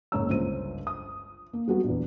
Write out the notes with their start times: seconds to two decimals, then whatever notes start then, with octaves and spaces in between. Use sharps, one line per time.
0.12 F#1 G#2 A#3 C#5 A#5 E6
0.29 G1 C#2 C5 D#7
0.87 D#6
1.53 A#3
1.67 F#3 G3 B3 F#4
1.84 A#1 E2